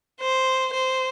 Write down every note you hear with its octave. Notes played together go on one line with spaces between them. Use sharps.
C5
C5